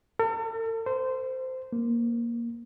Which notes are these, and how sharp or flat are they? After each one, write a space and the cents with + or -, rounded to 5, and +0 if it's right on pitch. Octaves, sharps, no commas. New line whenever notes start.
A4 +45
C5 -15
A#3 +10